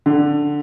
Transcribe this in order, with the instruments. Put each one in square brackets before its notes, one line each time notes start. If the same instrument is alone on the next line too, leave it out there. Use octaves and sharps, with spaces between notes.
[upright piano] D3